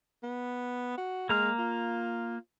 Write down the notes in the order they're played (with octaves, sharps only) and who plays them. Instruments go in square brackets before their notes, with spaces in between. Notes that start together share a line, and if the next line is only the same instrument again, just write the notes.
[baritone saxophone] B3
F#4
[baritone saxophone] G#3 [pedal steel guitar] A#3 A#5 F6
[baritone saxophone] F4